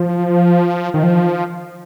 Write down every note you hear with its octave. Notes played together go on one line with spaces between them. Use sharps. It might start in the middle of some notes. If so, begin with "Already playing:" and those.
Already playing: F3
D#3
F3